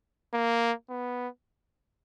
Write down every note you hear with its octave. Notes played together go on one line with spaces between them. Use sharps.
A#3
B3